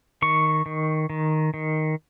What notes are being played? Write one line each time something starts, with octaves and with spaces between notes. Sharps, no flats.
D#3 C#6
D#3
D#3
D#3